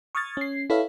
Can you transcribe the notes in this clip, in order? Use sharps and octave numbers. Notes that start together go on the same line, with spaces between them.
C#6 D#6 F6 G#6 A6
C#4 C7
E4 A4 B4 C#5 E5 F5